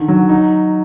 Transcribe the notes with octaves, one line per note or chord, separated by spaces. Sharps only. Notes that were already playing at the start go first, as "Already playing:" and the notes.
Already playing: D3 D#3
F#3
D#4